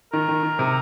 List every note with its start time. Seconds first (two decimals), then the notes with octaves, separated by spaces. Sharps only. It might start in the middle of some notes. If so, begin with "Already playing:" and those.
0.12 D#3 A#4
0.28 D#3
0.43 D#3
0.59 C3